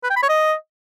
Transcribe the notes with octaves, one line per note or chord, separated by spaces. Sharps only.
B4
G5
B5
C#5
D#5